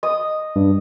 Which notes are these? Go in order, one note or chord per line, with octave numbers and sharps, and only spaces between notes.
D#5 D#6
G2